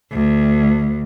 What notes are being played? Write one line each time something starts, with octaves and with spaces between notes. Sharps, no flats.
D2